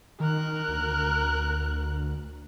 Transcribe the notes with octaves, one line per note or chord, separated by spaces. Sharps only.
D#3 A#4 F#6
D2